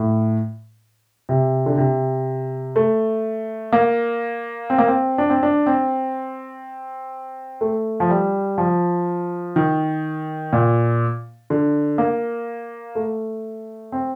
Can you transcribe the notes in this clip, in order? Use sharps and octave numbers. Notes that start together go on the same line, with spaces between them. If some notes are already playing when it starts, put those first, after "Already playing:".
Already playing: A2
C3
D3
C3
A3
A#3
C4
A#3
C4
D4
C4
D4
C4
A3
F3
G3
F3
D#3
A#2
D3
A#3
A3
C4